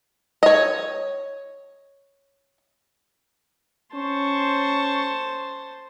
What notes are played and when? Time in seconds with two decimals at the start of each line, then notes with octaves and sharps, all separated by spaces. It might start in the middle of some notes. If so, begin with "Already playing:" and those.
0.43 C#5 D#5
3.95 C#4 C5 A5 C#6